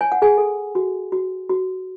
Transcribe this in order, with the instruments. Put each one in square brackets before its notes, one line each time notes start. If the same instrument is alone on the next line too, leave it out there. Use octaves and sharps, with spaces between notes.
[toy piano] C#5 G#5
F#5
G#4 G#5
A4
F#4
F#4
F#4